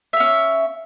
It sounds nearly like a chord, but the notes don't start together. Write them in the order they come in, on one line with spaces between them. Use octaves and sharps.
E5 F5 C#4